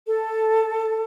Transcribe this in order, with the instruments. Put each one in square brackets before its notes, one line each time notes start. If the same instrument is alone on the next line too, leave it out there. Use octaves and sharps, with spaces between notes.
[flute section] A4